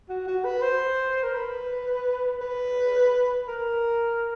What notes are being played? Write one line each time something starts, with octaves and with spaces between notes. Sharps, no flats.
F#4
F#4
B4
C5
A#4
B4
B4
A#4